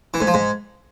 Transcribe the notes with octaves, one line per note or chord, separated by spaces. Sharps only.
E3
G#2
F3
G#2